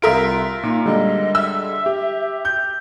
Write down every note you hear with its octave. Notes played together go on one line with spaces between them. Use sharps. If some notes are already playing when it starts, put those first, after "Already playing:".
C2 F4 A#4 E5 C6 D7
A#2 D#4
D3 G3 G#3 D#5
E5 E6
G4
G6